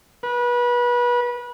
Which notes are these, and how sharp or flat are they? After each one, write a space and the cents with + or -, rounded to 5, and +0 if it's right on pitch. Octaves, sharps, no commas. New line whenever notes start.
B4 -30